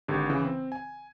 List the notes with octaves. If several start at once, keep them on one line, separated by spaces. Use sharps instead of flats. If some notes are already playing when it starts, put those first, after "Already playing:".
G#1 D3 G4
C#3 E3
C4
G#5